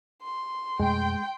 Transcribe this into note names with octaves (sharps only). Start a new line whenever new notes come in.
C6
F2 B2 G#3 A3 G5